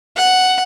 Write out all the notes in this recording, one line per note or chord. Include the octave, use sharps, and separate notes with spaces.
F#5